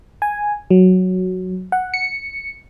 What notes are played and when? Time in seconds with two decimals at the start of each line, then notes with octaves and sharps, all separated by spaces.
0.22 G#5
0.71 F#3
1.72 F#5
1.94 C#7